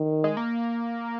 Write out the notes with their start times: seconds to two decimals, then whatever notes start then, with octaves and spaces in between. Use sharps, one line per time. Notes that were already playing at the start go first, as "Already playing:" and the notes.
Already playing: D#3
0.24 G#3
0.37 A#3